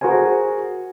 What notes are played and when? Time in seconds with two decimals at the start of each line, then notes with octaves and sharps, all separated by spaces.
0.01 F#4 G#4 A#4 C5 G#5